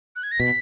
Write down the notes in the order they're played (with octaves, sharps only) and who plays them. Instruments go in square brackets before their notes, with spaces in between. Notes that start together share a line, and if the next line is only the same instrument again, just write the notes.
[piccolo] F#6
G#6
A#6
[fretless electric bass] B2 [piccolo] B6